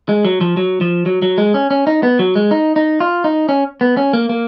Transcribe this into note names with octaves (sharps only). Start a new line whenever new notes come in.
G#3
F#3
F3
F#3
F3
F#3
F#3
G#3
C#4
C#4
D#4
B3
F#3
G#3
D#4
D#4
F4
D#4
C#4
B3
C#4
A#3
A#3